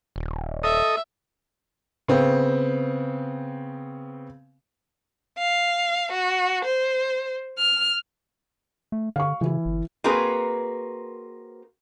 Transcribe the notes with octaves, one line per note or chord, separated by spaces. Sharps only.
D#1
A4 D#5 E5 D#6
C#3 B3 C4
F5
F#4
C5
F6
A3
D3 F5 C#6
C#3 E3 E4
G1
A#3 C4 F#4 G#4 A#4 B4